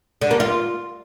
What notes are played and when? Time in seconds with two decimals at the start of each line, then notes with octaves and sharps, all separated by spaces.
0.21 D3
0.31 A#3
0.40 F4